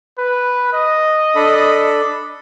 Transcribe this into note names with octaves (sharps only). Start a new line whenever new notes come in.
B4
D#5
D4 A4 B5